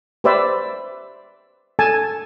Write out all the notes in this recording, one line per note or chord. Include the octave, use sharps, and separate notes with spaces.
G4 B4 C5 D5 E5
A4 G#5 A5